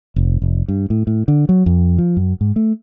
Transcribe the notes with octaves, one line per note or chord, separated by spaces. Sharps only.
F1
F1
G2
A2
A2
D3
F#3
F2
F3
F#2
G#2
A3